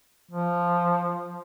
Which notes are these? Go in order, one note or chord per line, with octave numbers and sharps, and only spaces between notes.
F3